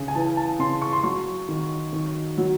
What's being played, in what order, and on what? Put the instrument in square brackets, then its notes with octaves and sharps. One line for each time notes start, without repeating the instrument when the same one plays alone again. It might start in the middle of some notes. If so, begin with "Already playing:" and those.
Already playing: [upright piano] C#3
G#5
E3 A5
A5
C#3 C6
C#6
C6
F#3 C#6
D#3
D#3
F#3